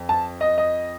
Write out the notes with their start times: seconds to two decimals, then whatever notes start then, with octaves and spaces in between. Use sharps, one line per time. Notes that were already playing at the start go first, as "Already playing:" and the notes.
Already playing: F2
0.09 A5
0.41 D#5
0.58 D#5